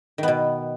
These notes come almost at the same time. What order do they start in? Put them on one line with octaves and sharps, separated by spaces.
D#3 B3 B2